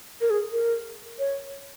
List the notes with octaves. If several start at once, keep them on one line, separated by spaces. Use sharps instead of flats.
A#4
G#4
A#4
C#5